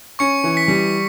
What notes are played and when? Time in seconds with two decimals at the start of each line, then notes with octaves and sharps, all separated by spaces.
0.19 C#4 C#6 C#7
0.44 E3
0.57 B6
0.68 G3